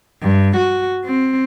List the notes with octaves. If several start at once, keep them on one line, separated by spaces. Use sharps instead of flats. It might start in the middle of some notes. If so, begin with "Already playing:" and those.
G2
F#4
C4